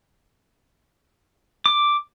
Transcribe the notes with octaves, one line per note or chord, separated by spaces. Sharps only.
D6